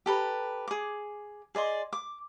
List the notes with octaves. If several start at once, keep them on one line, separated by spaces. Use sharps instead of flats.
G4 A4 B4 A#5
G#4 D6
G#4 D5 D#5 C6
D6